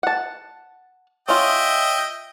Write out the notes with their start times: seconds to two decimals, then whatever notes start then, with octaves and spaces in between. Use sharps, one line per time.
0.03 F#5 A5
1.29 C#4 F4 D#5 E5 G5